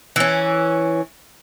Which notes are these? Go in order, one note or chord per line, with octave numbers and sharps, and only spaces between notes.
E3 C#4